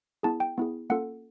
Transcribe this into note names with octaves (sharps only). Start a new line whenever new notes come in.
B3 E4 G#4 A5
G5
B3 E4 G#4
A#3 C#4 F4 A4 F#5